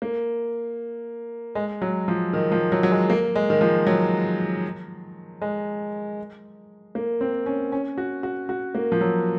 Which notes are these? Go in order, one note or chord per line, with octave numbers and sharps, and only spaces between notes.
A#3
G#3
F#3
F3
D#3
F3
F#3
F#3
G#3
A#3
G#3
D#3
F3
F#3
G#3
A#3
C4
C#4
C#4
F#4
F#4
F#4
A#3
F3
F#3